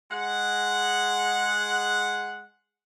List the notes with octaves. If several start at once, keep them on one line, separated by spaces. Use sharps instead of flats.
G#3 F#5